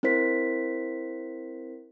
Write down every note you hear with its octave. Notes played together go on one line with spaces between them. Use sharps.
C4 E4 A#4 C5 B6